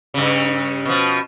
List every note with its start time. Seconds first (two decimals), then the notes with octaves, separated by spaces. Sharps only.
0.14 G2 C#3
0.85 B2 F3